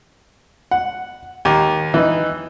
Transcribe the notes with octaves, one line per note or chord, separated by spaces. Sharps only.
F#5
D#2
E3 D#4